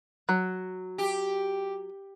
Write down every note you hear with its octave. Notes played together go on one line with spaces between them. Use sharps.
F#3
G4